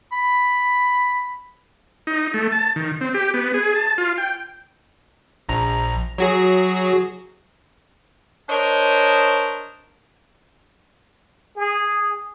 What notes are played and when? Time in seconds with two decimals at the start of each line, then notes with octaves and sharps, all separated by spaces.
0.13 B5
2.07 D#4
2.34 A3
2.52 A5
2.76 D#3
3.01 C4
3.14 G4
3.34 B3
3.54 G#4
3.75 A5
3.98 F4
4.18 G5
5.49 A#1 A#5
6.18 F#3 F#4 G#4
8.49 D4 A#4 C5 C#5 D#5
11.57 G#4